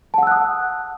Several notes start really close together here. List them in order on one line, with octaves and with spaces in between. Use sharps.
A5 F#5 E6 F#6 D#6